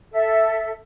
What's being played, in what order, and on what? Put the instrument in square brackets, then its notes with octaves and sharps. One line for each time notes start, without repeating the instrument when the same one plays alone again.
[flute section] A4 E5